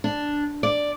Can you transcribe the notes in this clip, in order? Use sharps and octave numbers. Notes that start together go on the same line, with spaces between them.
D4
D5